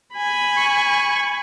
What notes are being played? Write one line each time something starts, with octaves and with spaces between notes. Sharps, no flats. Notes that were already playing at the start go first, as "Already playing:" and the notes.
G#5 B5
C#6